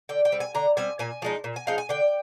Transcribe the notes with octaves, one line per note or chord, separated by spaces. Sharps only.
D3 G5
G5
G3 C4
G#5
D3 A#5
G3 C4 G#5
A#2 G#5
F3 G#3 D#4
A#2
G#5
F3 G#3 D#4 F5
G#5
D3 G5